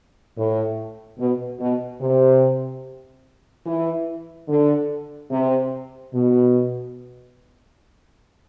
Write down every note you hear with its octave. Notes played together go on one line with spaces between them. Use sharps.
A2
B2
B2
C3
E3
D3
C3
B2